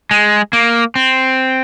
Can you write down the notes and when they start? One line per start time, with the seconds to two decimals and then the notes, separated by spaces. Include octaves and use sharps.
0.11 G#3
0.53 A#3
0.95 C4